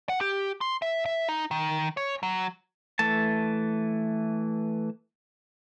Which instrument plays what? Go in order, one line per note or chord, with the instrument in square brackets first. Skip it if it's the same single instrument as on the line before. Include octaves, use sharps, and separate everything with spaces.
[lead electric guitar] F#5
G4
C6
E5
E5
D#4
D#3
C#5
F#3
[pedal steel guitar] E3 A3 A5